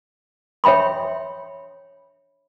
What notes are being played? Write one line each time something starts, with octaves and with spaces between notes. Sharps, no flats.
C#5 E5 G5 B5 C6